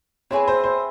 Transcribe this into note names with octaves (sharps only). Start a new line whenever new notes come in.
C4 E4 G#4 B4 C#5
C5
C5